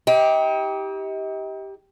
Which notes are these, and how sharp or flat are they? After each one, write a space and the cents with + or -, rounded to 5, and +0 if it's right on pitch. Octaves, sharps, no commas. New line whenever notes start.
D#4 +40 G4 +0